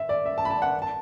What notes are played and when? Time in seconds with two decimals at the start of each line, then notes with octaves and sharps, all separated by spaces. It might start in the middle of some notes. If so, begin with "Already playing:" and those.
Already playing: E5
0.09 D5
0.26 E5
0.38 A5
0.45 B5
0.50 A5
0.62 F#5
0.82 A5